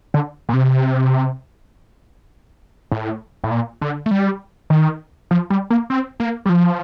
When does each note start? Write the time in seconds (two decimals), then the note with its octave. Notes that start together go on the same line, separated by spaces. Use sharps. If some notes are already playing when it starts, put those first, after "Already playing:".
0.14 D3
0.49 A#2
0.53 C3
2.92 A2
3.44 A2
3.51 A#2
3.82 D3
4.06 A3
4.11 G3
4.70 D#3
5.31 F3
5.50 G3
5.70 A#3
5.90 C4
6.20 A#3
6.46 G3
6.49 F3